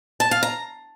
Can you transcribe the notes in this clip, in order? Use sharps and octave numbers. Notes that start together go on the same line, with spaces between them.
A5
F5
A#5